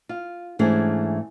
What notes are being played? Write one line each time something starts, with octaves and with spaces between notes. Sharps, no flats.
F4
G#2 E3 A3 C#4 D4 G#4